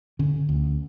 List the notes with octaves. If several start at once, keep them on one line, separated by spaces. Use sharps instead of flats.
D3 C#4
D2